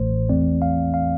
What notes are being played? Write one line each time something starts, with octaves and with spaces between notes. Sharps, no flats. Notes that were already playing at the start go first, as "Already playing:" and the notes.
Already playing: A1 A2 E3 A3 C5
E2 E3 A3 C4 D5
F5
F5